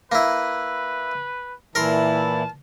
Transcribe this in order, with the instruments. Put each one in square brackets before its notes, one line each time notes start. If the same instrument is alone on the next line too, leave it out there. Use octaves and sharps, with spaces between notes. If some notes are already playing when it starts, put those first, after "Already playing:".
[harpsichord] A#3 E4 [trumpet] B4
[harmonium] A#2 E3 E4 [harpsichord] A#4 C6 [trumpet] A5